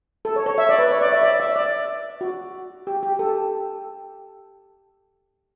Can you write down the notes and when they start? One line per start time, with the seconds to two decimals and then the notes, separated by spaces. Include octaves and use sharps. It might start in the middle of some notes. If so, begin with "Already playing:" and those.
0.25 A4
0.36 C#5
0.46 C#5
0.58 E5
0.69 D5
0.79 B4
0.91 C#5
1.01 D5
1.12 E5
1.23 D5
1.40 E5
1.56 D5
2.21 F#4
2.87 G4
3.03 G4
3.19 A4